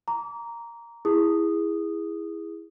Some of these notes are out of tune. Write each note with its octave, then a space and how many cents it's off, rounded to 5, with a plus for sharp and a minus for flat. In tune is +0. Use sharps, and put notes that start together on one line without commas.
A#5 +0 D6 -30
E4 +0 G#4 -15 D#6 -10